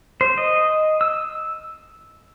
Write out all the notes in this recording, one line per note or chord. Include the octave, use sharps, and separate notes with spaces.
C5
D#5
E6